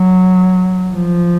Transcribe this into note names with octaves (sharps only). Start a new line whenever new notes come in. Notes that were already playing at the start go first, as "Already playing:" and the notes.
Already playing: F#3
F3